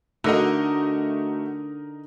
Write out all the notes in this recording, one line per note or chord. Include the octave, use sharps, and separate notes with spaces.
D3 A3 D#4 F#4 A#4 D#5